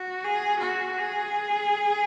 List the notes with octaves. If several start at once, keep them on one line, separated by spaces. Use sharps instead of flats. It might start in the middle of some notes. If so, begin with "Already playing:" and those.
Already playing: F#4
G#4
F#4
G#4